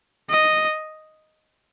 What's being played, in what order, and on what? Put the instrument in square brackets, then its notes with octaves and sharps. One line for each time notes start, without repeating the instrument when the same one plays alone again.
[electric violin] D#5